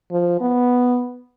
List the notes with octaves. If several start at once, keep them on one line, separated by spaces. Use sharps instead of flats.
F3
B3